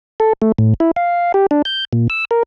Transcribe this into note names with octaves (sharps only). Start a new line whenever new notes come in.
A4
A3
A2
E4
F5
G4
D4
G6
A#2
E6
A#4